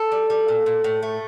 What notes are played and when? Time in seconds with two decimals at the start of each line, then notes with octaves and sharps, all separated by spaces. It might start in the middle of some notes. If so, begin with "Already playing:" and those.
Already playing: A4
0.12 G3
0.30 G3
0.48 A#2
0.66 A#2
0.84 A2
1.03 A3